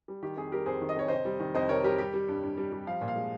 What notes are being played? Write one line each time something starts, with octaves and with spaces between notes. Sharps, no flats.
G3
D#3 G4
F2 G#4
G3 G4 A#4
F2 G#4 C5
D#3
D#5
F2 C#5
C3 C5 D#5
G3
D#3
F2 C5 D#5
C3 A#4 C#5
G3 G4 A#4
G3 G4
G3
G2
G2
G3
G3
F3 F5
A#2
F5
G#3